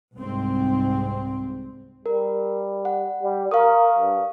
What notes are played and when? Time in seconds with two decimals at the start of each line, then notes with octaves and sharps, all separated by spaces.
0.16 C2 G#2 C4
2.06 G3 A#4
2.85 F#5
3.22 G3
3.51 A#4 F5 C#6 D#6
3.99 G2